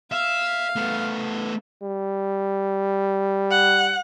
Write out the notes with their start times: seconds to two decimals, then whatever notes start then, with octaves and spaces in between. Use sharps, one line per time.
0.12 E5 F5
0.76 A3 B3
1.83 G3
3.51 F#5